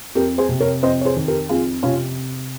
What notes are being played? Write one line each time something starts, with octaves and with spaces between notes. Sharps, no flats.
F2 G4 A#4
G#4 C5
C3
A#4 C#5
F2 C5 D#5
C#5
G#4 C5
D#3
G4 A#4
F2 F4 G#4
C3 C#4 F4